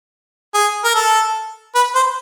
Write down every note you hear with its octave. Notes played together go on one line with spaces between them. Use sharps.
G#4
A#4
A4
B4
C5